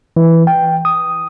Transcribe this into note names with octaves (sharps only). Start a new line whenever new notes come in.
E3
G5
D#6